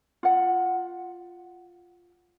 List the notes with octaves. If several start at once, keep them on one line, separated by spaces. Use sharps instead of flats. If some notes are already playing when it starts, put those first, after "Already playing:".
F4 F#5